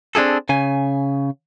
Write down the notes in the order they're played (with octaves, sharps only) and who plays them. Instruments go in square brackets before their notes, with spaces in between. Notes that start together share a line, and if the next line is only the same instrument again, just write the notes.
[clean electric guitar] C4 D4 E4 G#4 A4
C#3 G#5